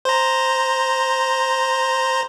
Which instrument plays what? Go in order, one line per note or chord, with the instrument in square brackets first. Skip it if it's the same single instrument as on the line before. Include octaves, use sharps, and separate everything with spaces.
[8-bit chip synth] C5 A#5